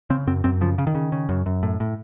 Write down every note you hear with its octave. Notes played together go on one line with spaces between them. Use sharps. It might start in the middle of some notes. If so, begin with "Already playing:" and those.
C#3 C4
F#2 C4
F#2 C4
C#3 F3
C#3
D#3
C#3
C#3
F#2
F#2
A2
A2